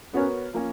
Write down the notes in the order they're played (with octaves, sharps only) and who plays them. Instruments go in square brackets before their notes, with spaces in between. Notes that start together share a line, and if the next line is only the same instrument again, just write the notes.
[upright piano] B3 F#4 A#4 C#5 [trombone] C#4
[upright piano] F3 A#3 C#4